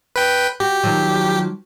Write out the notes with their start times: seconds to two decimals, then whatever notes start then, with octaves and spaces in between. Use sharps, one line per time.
0.16 B4 G5
0.60 F#4 G4
0.83 D#3 F3 F#3